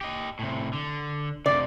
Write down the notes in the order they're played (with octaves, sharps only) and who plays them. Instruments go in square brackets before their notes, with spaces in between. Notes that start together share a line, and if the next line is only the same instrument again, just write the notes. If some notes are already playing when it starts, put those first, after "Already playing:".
[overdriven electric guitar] G4 D#5
A2 C3
D3
[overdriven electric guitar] F2 C3 [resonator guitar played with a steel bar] D5